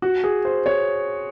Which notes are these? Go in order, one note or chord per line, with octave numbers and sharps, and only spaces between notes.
F#4
G#4
C5
C#5